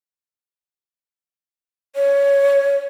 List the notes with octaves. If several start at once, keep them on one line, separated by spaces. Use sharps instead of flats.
C#5